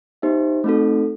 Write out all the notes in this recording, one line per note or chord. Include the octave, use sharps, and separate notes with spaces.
B3 D#4 G4 C5 E5
A3 C4 D#4 F#4 A4